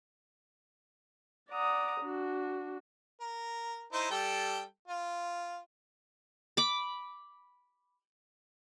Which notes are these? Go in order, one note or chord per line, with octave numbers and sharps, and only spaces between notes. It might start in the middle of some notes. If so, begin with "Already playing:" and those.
D5 F#5 A#5 D#6
D4 F#4
A#4
D#4 E4 C5
G3 A4 G5
F4
B5 D6